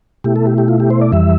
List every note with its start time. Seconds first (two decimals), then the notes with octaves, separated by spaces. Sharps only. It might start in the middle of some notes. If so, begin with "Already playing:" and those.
0.24 B2 A3 E4 G4
0.36 A4
0.47 G4
0.58 G4
0.68 F4
0.80 G4
0.90 C5
1.01 D5
1.12 F2 E3 G3 E5